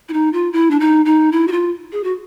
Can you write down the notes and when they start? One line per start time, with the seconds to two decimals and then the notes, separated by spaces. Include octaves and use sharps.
0.09 E4
0.13 D#4
0.33 F4
0.53 E4
0.71 D4
0.80 D#4
1.06 D#4
1.32 E4
1.48 F#4
1.52 F4
1.92 G#4
2.04 F#4